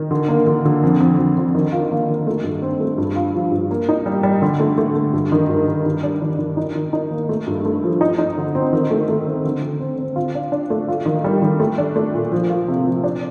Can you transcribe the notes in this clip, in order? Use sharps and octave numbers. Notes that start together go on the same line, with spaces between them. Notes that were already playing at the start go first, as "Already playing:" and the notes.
Already playing: D#3
D3
A#3
D3
D3
F2
F2
F2
D3
D#3
F4
A#3
D#3
A3
G2
C4
A3
G2
F4
F3
G2
A#3
D#4
G3
G3
D3
A3
A3
A3
G2
D#3
G2
G2
D#3
D4
D#3
D#3
D#4
D#3
D#4
A#3
A3
G2
A3
F3
D#4
D#4
D3
C4
D#3
A3
A3
C4
D3
D3
C4
C4
F4
D4
D4
A3
F4
D#3
G3
D#3
A3
D4
A3
A#2
F3
F4
C3
F3
D4